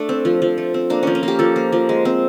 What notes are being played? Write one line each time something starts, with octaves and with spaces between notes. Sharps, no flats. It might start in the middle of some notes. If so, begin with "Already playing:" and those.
Already playing: A3 D4
C4
F3
F3
A3
C4
A#3 D4
F3 C#4
C#4
A#3
G4
F3 A4
A#3
F3
G#3
C4